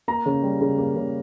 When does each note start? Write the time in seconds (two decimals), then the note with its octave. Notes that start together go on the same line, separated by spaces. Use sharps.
0.08 A#3 A#5
0.26 C#3
0.43 G3
0.61 C#3
0.78 A#3
0.96 C#3